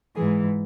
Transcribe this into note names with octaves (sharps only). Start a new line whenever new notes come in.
G#2 E3 G#4